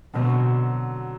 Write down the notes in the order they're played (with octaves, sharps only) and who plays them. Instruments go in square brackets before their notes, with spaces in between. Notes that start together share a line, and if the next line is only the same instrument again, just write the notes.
[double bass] B2 [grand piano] D3 F#3 C4